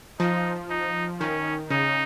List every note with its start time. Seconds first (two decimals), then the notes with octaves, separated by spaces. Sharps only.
0.20 F3 D#4
0.71 D#4
1.20 D#3 C#4
1.70 C#3 D#4